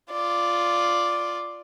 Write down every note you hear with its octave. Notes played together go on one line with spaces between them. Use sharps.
F4 D5